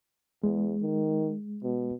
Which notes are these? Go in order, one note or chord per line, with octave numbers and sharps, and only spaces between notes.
E2 G#3
D#3
B2